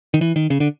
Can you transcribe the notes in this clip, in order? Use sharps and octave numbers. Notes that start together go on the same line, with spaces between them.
D#3
E3
D#3
C#3
D3